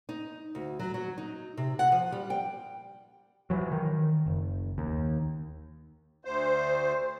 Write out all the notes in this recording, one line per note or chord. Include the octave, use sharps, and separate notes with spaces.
D#4
D2
F#3
F#3
D#4
C3
F#5
F3
G3
G5
E3 F#3
D#3
F#1
D#2
D2 C5